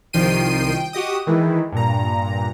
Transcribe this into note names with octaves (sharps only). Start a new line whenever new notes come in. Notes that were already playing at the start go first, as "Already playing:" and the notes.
C2 D#3 F3 G5 C7 D#7
G5
F#4 G4 D#5 D#6
D#3 E3 G#3
G2 A#2 A#5